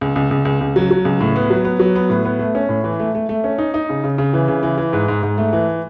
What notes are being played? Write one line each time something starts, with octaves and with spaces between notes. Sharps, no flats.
C#2
C#2
C#2
C#2
C#2
F#3
F#3
C#2
A2
B3
F#3
B3
F#3
B3
A2
B3
A3
C#4
A2
E3
A3
A3
A3
C#4
D#4
D#4
C#3
C#3
C#3
E3
C#3
E3
E3
G#2
G#2
G#2
A3
E3